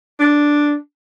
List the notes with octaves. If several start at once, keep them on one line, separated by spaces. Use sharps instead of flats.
D4